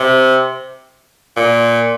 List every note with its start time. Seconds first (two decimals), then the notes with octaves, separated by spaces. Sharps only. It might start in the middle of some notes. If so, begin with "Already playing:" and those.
Already playing: C3
1.36 A#2